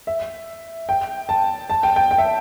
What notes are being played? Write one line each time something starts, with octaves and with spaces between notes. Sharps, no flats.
E5
G5
A5
A5
G5
G5
G5
E5